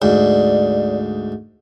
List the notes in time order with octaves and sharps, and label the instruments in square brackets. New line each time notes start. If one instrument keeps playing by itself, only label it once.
[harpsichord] D2 G#2 [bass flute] D5